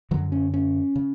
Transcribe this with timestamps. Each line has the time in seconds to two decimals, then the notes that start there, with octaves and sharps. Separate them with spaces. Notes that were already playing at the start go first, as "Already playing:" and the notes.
0.11 F#2 D3 F#3
0.32 C#4
0.54 C#4
0.96 C#3